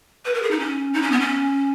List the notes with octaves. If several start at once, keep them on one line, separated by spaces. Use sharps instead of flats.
B4
A#4
G#4
D#4
C#4
D#4
C#4
B3
C#4